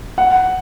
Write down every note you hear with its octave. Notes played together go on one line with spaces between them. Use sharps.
F#5